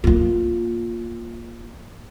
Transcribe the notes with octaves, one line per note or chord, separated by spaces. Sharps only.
A#3 F4